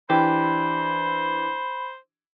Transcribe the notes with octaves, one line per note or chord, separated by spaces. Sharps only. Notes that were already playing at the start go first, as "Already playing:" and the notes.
E3 D4 E4 G4 C5 B5